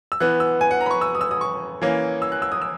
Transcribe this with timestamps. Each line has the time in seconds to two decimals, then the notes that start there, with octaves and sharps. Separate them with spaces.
0.12 E6
0.20 E3 B3 F#6
0.40 E6
0.61 G#5
0.71 F#5
0.81 A#5
0.86 B5
0.91 C#6
1.01 E6
1.15 D#6
1.21 E6
1.31 D#6
1.41 C#6
1.82 E3 A#3 C#4
2.22 E6
2.32 F#6
2.42 E6
2.52 D#6
2.62 E6